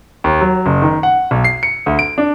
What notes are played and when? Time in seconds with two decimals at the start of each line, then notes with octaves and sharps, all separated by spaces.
0.24 D#2
0.41 F#3
0.66 F#1
0.82 D#3
1.03 F#5
1.31 B1
1.44 C7
1.63 C#7
1.86 D2
1.99 D7
2.18 D4